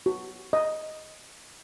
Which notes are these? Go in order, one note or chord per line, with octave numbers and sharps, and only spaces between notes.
F#4
D#5